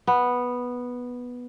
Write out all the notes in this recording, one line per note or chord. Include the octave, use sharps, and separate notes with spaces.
B3